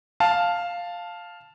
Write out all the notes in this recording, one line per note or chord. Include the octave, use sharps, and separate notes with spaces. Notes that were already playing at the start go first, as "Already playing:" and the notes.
F5 A5